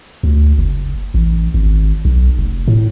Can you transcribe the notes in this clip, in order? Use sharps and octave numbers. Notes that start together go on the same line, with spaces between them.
D2
F#1
A1
G#1
B1
F1
A2